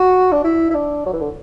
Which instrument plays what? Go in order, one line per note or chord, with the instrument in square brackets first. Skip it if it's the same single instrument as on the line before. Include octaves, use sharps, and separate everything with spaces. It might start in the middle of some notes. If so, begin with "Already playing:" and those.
Already playing: [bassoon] F#4
D4
E4
E4
D4
F#3
E3
D3